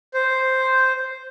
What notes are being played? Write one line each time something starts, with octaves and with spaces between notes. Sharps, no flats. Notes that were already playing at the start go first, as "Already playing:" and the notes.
C5